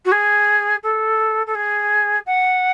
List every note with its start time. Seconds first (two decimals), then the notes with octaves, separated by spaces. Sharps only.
0.05 F#4
0.11 G#4
0.83 A4
1.46 A4
1.55 G#4
2.26 F#5